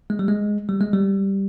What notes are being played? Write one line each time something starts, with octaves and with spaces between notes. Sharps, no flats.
G#3
G3
G#3
G3
G#3
G3